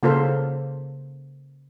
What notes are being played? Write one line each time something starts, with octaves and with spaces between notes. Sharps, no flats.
C#3 A#3 F4 A4 C5